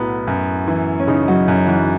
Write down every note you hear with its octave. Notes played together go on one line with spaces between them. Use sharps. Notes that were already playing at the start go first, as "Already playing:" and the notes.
Already playing: B1 A2 B3 E4 F#4
F#2
E3
C#4
C#3 D#4
F#3
F#2
E3